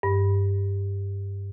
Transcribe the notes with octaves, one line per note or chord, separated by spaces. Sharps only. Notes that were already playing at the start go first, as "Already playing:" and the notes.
G2